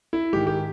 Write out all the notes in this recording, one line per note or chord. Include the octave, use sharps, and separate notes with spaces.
E4
G#2 D#3 G4
G4